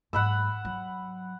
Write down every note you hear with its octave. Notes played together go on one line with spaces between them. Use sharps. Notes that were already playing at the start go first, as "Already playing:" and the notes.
G#2 F#3 F#5 B5 E6
F#3